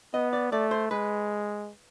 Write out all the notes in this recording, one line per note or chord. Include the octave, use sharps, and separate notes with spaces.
B3 D#5
D5
A3 D5
C5
G#3 B4